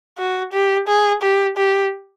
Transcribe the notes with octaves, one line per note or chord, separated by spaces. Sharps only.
F#4
G4
G#4
G4
G4